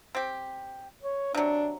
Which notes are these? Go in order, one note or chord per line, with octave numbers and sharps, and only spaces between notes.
C4 G4
C#5
C3 F#3 D4